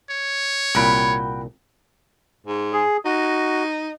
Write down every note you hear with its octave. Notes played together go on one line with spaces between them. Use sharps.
C#5
C2 A#2 F#4 G5 B5
G#2
G#4
D#4 F#4